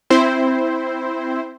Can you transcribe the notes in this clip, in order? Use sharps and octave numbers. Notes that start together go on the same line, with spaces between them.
C4 E4 C5